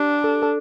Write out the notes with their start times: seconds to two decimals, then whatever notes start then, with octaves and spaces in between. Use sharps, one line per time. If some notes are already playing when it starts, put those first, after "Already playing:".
Already playing: D4 G4
0.24 A4
0.42 A4